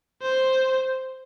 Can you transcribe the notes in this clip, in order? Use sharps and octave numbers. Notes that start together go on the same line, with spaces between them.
C5